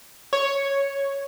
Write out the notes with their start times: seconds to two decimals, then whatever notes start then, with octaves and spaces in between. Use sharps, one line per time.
0.33 C#5